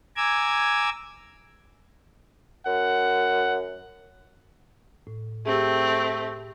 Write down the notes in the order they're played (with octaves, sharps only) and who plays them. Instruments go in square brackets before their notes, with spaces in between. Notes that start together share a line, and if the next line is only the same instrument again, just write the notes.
[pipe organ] G#5 A#5 D6 E6 G#6
[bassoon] F#2 [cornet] F#5
[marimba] A2
[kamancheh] A3 C4 [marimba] G4 G#4